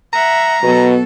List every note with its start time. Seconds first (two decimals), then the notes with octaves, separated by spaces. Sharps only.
0.13 E5 F#5 A#5
0.63 B2 F#3 B3 A4